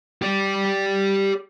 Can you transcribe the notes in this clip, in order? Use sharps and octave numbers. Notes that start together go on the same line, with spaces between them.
G4 D5